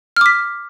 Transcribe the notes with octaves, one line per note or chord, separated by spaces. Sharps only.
D6 F6 B6